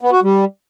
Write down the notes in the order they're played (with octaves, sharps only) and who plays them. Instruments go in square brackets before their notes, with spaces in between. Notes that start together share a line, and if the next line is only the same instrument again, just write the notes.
[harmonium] B3
F#4
G3